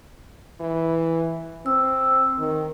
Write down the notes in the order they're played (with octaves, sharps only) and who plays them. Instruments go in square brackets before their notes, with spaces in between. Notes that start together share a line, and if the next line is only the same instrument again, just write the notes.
[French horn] E3
[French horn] C4 [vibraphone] E6
[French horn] D#3